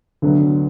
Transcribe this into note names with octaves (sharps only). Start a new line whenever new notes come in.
D2 D3 F#3 B3